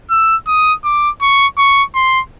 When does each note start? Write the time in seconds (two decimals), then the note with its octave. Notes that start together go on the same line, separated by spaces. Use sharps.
0.10 E6
0.48 D#6
0.84 D6
1.21 C#6
1.58 C#6
1.95 C6